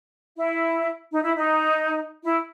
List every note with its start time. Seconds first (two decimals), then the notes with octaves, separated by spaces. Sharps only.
0.36 E4
1.11 D#4
1.23 E4
1.37 D#4
2.24 E4